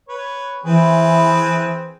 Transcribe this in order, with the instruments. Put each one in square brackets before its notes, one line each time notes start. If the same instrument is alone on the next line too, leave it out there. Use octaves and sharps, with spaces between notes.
[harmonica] B4 C#5
[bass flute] E3 [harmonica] C4 G#4 B4